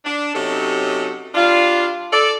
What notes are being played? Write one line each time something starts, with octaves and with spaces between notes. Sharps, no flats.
D4
C3 F#3 C#4 D#4 A4
G3 D4 F4
A4 D5